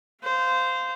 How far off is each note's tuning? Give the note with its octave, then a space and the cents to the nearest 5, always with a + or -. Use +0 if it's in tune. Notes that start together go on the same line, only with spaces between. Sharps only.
C5 -15 F5 +0